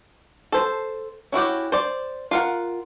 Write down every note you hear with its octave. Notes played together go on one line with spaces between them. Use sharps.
A4 C5
C#4 E4 F#4 G4
C5 D5
F4 A#4 F#5